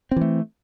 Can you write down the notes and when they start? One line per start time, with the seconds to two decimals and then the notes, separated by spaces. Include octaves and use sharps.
0.11 C4
0.16 E3
0.21 A3